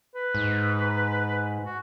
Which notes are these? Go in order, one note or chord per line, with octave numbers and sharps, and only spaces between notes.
B4
G#2
F#4